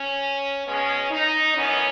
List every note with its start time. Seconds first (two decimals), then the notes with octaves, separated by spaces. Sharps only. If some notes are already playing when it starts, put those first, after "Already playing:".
Already playing: C#4
0.66 B2 G#3 B3 C#4
1.11 D#4
1.55 F#2 E3 B3 C#4